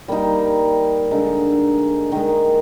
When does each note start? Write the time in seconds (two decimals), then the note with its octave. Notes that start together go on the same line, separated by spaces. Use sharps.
0.08 G3 A#3 D#4 G4
1.11 D3 G#3 D#4
2.12 D#3 G#3 D#4